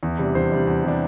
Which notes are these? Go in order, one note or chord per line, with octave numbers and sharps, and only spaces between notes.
E2
C3 G3 D4
E2 C5
C3 G3 D4
E2
C3 G3 D4